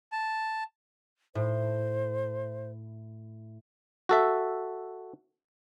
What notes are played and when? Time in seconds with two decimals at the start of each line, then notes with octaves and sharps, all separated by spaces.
0.12 A5
1.35 A2 C5
4.09 F#4 A4 E5